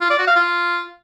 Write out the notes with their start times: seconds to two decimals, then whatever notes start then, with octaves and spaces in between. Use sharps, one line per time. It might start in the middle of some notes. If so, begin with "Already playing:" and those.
0.02 F4
0.10 D5
0.19 F#4
0.27 F5
0.36 F4